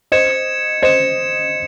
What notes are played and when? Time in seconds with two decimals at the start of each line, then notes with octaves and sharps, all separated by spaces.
0.12 C5 D#5 G#6 C#7 E7
0.82 C5 D#5 G#6 C#7 E7